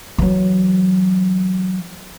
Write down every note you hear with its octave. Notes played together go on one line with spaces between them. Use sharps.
E3 F#3